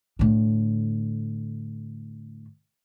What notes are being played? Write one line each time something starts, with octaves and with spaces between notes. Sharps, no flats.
A2 D3